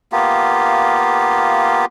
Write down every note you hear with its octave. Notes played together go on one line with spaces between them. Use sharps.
A#3 B3 F4 G4